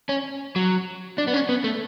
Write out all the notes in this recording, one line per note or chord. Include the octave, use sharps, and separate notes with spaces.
C#4
F#3
D4
B3
C#4
B3
A3